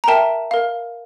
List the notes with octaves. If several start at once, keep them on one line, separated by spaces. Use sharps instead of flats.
A#5
A#4 E5 G5 A5
A#4 F5